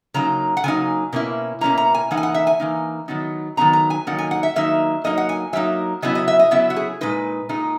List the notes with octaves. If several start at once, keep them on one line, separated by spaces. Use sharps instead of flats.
C#3 F#3 A#3 D#4 A#5
F#5
C#3 F#3 A#3 D#4 G#5
B2 A#3 C#4 E4
B2 A#3 C#4 E4 A#5
A#5
G#5
E3 A#3 D#4 F#5
G#5
F#5
E5
G#5
E3 A#3 D#4
D#3 F#3 B3 D#4
D#3 F#3 B3 D#4 A#5
A#5
G#5
D#3 F#3 A#3 D#4 F#5
G#5
F#5
E5
D#3 F#3 A#3 D#4 E5
F#3 A#3 D#4 D#5
F#5
G#5
F#3 A#3 D#4 E5
C#3 F#3 B3 E4 D#5
D#5
E5
D#5
C#3 F#3 B3 E4 E5
F#4
G#4
A#2 G#3 D#4 B4
A#2 G#3 D#4